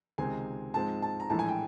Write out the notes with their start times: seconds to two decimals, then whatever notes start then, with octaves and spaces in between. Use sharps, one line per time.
0.18 C#2 C3 D#3 G#3 C4 G#5
0.74 G#2 F3 G#3 C4 A5
1.02 A5
1.20 A#5
1.30 A#1 A2 E3 G#3 A5
1.39 G#5
1.48 G5